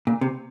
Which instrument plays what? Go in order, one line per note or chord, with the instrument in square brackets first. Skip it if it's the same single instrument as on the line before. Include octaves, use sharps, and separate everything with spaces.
[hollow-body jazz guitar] A#2
C3